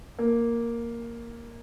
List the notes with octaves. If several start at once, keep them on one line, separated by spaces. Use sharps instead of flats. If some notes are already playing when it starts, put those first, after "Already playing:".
A#3